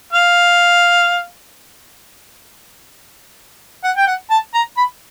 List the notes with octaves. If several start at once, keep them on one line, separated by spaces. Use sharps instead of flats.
F5
F#5
G5
F#5
A5
A#5
B5